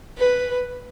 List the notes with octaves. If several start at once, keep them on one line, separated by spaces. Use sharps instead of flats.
B4